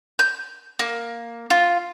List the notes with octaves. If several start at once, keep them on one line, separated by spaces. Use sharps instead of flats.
G6
A#3
F4